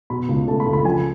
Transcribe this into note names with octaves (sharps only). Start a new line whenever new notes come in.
B2 B5
C#2
A3 A5
B5
C#2
B5
F3 G#5